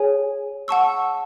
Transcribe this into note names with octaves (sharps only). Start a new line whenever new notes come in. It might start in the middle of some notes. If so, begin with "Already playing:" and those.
Already playing: G#4 C#5 G#5
F#5 A5 C#6 E6